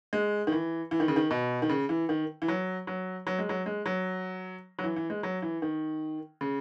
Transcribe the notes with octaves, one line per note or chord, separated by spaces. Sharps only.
G#3
D#3
E3
E3
D#3
C#3
D#3
B2
D#3
C#3
E3
D#3
E3
F#3
F#3
F#3
G#3
F#3
G#3
F#3
F#3
E3
E3
G#3
F#3
E3
D#3
C#3